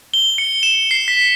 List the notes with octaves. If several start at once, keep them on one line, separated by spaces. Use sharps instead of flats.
G7
C#7
E7
C7
B6